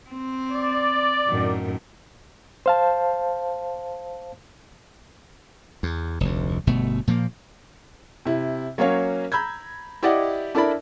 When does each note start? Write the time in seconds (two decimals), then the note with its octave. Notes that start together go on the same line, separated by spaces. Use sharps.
0.11 C4
0.52 D5
1.29 F#2 A2 D#3
2.66 C5 F5 A5
5.83 E2
6.20 F1 D2
6.67 G1 B2 A3
7.07 A#2 F3 F#3 A#3
8.25 C3 E4
8.78 F#3 A#3 C#4 F#4 C#5 F5
9.32 A#5 B5 E6 G6 G#6
10.03 E4 G4 D5 D#5 F#5
10.55 D4 E4 A4 A#4 D5 B5